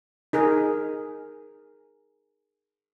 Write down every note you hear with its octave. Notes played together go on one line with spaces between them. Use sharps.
D#4 G#4 A#4